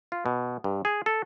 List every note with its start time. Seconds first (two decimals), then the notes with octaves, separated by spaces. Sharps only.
0.12 F4
0.26 B2
0.64 G2
0.85 G#4
1.06 A4